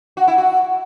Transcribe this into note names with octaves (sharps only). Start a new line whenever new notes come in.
F#4
E4
F#4